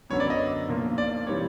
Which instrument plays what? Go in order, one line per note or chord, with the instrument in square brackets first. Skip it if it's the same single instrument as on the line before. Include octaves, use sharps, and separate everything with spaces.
[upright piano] F#2 D3 F#3 B3 [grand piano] C#5
[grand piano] D5
D#5
[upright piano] B1 A#2 F3 A#3
[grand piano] D5
[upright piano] E3 G3 C4 [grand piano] C#5